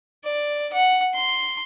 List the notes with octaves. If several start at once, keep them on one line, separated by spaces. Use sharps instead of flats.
D5
F#5
C6